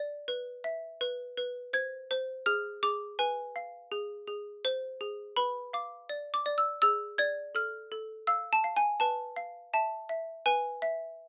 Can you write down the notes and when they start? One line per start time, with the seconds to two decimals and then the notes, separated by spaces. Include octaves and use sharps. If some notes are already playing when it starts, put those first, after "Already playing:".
Already playing: D5
0.28 B4
0.64 E5
1.01 B4
1.37 B4
1.73 C5 G#6
2.11 C5
2.46 G#4 F6
2.83 G#4 D6
3.19 B4 G#5
3.56 F5
3.92 G#4
4.27 G#4
4.65 C5
5.01 G#4
5.36 B4 B5
5.73 F5 D6
6.09 D5
6.34 D6
6.46 D5
6.58 E6
6.82 G#4 E6
7.18 D5 G#6
7.55 A4 F6
7.92 A4
8.27 F5 E6
8.53 A5
8.64 F5
8.77 G#5
9.00 B4 A5
9.36 F5
9.74 E5 A5
10.09 E5
10.46 B4 G#5
10.82 E5